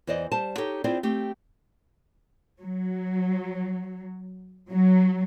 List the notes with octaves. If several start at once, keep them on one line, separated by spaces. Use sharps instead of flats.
E2 E3 C5 D5 D#5
G3 C5 A5
D#4 G4 A4 C#5
C4 E4 F4 G#4 C5 D5
A3 C4 G4
F#3
F#3